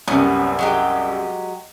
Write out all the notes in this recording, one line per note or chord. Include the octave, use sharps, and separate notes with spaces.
C2 F#2 C3 B3 C#4
F#3 G#3 G4